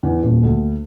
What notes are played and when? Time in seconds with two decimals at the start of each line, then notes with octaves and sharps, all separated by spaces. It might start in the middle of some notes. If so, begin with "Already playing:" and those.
0.03 E2
0.23 D#1
0.43 D2